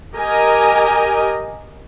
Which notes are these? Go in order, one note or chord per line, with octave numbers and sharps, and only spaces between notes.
G4 A#4 D#5 G#5